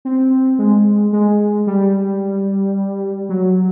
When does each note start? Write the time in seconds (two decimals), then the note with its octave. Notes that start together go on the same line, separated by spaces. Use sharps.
0.05 C4
0.59 G#3
1.13 G#3
1.67 G3
3.29 F#3